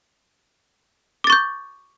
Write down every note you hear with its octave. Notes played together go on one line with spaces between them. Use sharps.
C#6 D6 G6 A6